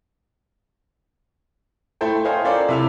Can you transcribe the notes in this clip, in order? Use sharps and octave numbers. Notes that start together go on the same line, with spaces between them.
A3 E4 A4 C5 G5
C5 C#5 D#5 F5 G5 G#5
C#4 F4 A4 A#4 C5 D5
C3 E4 E6 F7